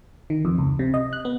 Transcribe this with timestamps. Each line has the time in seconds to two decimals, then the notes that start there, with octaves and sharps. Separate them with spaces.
0.30 D#3
0.45 F2
0.58 C#2
0.79 C3
0.94 D#5
1.13 F#6
1.25 B3